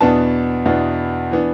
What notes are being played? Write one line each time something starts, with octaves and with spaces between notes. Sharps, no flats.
E2 B2 B3 D4 A5
E2 B2 B3 D4
E3 B3 D4